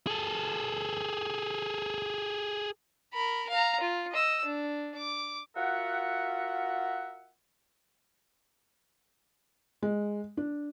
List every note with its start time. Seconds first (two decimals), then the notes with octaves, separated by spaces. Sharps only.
0.07 G#4 A4
3.14 A#4 B5
3.50 F5 A#5
3.80 F4
4.11 D#5 E6
4.45 D4
4.98 D6
5.56 F4 F#4 A#4 E5 F#5
9.82 G#3
10.37 D4